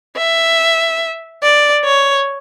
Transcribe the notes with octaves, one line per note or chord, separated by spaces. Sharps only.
E5
D5
C#5